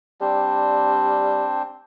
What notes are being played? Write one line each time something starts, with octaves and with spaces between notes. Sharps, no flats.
G3 C4 D4